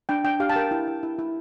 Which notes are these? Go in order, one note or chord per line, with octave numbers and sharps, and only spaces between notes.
D4 G5
D4 G5
G4 F5
A5
A#4 G5
E4
E4
E4
E4